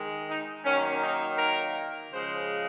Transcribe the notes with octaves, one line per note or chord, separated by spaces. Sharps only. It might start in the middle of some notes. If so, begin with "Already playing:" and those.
Already playing: D#3 G#3
D#4
D#3 F#3 A#3 C#4
D#4
A#4
C#3 F3 G#3 C5